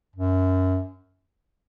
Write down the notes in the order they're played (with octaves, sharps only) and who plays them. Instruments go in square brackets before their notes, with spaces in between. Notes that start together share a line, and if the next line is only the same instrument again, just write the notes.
[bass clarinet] F#2